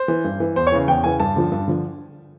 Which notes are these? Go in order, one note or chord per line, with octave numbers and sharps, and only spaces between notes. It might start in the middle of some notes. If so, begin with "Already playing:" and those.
Already playing: C5
E3
G2
E3
E2 C5
C#5
C#3 E3
E2 G5
C#3 E3 G#5
G2 A5
D3 F3
G2
D3 F3